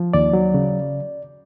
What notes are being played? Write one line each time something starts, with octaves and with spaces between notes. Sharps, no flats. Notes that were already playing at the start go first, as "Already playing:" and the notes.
Already playing: F3
D#2 D5
F#3
C#3